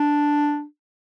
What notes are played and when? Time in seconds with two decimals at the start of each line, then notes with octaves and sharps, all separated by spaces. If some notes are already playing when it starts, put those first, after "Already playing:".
Already playing: D4